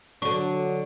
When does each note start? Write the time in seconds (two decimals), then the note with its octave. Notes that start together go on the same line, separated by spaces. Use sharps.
0.22 D3 F#3 D4 C#6